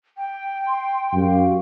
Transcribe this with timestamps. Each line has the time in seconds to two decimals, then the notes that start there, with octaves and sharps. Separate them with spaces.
0.17 G5
0.68 C6
1.13 F#2 F#4 G4 F5